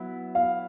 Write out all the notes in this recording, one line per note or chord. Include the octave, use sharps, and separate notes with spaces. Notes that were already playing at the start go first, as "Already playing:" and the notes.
Already playing: F#3 B3 E4
F5